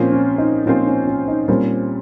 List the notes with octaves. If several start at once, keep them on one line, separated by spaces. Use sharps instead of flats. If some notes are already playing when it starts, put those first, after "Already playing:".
Already playing: A#2 F3 C4 C#4 F4 C5
C#4
D#4
A#2 F3 C4 C#4 F4 C5
C#4
C#4
D#4
A#2 G3 C4 C#4 F4 C5